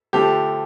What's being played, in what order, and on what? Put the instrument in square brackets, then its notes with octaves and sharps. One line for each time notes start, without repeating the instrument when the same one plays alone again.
[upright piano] D3 F3 A3 G4